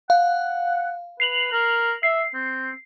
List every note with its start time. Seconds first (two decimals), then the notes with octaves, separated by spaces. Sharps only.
0.10 F5 F#5
1.20 B4 C7 F7 F#7
1.52 A#4
2.03 E5 C7
2.34 C4